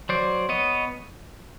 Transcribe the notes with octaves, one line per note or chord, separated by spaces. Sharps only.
F#3 C5 D5
B3 C#5 D#5